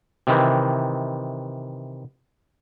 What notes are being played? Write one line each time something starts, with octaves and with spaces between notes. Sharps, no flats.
C3 D#3 E3